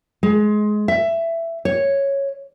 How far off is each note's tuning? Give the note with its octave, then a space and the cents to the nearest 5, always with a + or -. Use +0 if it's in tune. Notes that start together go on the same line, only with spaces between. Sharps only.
G#3 +20
E5 +15
C#5 -5